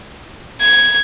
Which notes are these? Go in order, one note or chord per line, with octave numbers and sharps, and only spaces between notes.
G#6